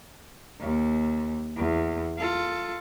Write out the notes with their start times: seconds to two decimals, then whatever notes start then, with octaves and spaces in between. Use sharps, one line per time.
0.60 D#2
1.57 E2
2.18 F4 A4